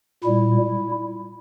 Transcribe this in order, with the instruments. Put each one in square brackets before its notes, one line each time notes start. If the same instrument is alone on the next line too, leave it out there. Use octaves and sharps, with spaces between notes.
[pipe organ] A#2 G3 E4